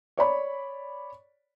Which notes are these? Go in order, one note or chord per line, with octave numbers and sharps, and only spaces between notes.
C#5 D5 B5